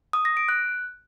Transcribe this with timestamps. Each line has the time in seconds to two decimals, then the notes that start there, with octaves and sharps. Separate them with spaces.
0.13 D#6
0.25 A#6
0.37 D7
0.49 F#6